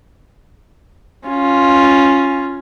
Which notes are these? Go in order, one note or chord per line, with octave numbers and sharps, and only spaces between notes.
C#4 F4